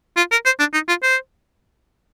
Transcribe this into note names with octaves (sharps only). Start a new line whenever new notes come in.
F4
A#4
C5
D4
D#4
F4
C5